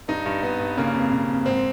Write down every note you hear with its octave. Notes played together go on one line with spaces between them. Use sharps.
G2 D#4
G2
G2 B3
G2
C#3 A#3
F2
C#3
F2
G#2 C4